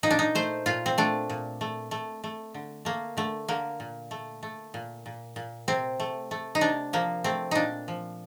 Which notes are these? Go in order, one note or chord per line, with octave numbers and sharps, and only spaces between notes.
A#2 D#4
D4
D#4
A3 C5
A#2 F4
C4
A3 D4
A#2
A3
A3
A3
D3
A3 A#3
D3 A3
D3 A#3
A#2
A3
A3
A#2
A#2
A#2
C3 C4
A3
A3
D#4
C3 D4
F3 A#3
A3 C4
A#2 D4 D#4
F3